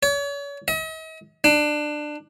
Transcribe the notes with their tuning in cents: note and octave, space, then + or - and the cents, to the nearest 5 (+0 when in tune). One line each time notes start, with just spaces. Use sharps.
C#5 +40
D#5 +45
D4 +20